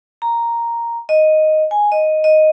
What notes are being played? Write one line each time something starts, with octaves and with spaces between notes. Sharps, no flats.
A#5
D#5
G#5
D#5
D#5